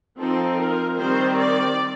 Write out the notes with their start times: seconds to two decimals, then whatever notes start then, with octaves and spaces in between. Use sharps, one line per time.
0.19 F3 C4 D#4 A4
0.58 A#4
0.98 D#3 G3 C4 D#4 C5
1.38 D5